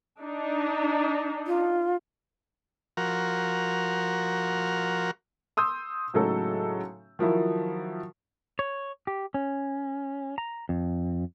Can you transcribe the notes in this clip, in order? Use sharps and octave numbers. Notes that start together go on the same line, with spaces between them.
D4 D#4
F4
F3 F#4 A#4
C6 D#6 E6 G6
A2 C#3 F#3 G#3 D#4 A4
D#3 F3 F#3 E4
C#5
G4
C#4
A#5
F2